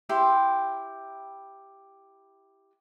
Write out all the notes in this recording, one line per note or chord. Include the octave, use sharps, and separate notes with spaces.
E4 G4 G5 C6